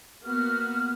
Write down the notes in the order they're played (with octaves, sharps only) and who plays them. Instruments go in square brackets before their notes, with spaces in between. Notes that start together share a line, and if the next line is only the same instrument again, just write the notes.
[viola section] A#3 B3 F#4 [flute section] F6